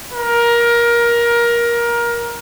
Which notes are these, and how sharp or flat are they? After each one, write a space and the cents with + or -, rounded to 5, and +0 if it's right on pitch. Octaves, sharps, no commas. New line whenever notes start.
A#4 +20